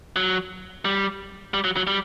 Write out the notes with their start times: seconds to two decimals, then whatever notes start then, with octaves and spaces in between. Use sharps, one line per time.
0.16 F#3
0.85 G3
1.54 G3
1.64 F#3
1.77 F#3
1.87 G3